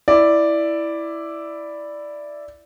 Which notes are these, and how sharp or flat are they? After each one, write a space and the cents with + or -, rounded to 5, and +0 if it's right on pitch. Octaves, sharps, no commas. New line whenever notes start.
E4 +0 D5 +0